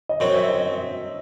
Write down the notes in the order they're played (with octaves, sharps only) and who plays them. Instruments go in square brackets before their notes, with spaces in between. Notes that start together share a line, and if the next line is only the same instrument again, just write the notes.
[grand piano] D#5
[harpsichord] F#2 F#3 C4 [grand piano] C5
[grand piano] E5
D#5